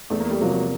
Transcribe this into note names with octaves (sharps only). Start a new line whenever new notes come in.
E2 A3
A#3
G3 A3
C3 F3 F#3 G#3 A#3